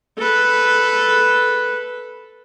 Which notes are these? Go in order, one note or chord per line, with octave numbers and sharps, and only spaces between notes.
A4 B4